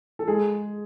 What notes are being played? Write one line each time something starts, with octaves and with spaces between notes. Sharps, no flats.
A4
G#3 G#4